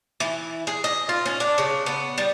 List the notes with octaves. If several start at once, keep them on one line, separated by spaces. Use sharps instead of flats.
E3
G#4
D#5
F4
C#4
D4
C#3
B3
G3